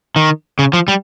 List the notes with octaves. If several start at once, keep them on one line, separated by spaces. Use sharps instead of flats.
D#3
C#3
F3
G3